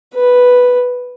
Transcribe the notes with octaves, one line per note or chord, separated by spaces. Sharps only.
B4